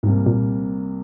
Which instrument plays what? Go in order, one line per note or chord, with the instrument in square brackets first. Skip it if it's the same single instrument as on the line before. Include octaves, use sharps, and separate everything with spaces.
[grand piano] C2 C3 G3 A#3 [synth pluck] G#2
[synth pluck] A#2